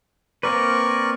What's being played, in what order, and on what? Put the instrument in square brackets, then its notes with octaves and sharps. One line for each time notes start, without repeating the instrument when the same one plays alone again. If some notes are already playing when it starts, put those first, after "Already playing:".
[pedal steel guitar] A#3 C4 B4 [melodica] A#4 D5 C#6